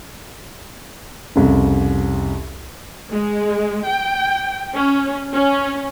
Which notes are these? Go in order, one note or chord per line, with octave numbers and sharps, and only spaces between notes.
C2 F2 C#3
G#3
G5
C#4
C#4